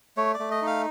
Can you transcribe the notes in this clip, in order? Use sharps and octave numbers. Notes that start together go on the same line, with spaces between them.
A3 C#5
D5
A3
D#5
D#4 F5